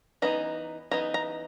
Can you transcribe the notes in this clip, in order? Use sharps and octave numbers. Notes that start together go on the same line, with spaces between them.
E3 B3 D#4 A#5
E3 B3 D#4 A#5
A#5